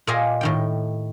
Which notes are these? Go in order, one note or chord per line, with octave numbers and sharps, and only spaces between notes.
A#2 A#3 G4 A#4 D#5 G#5
A2 D#3 G5